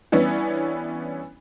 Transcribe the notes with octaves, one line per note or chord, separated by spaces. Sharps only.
E3 G3 B3 C#4 D4 E4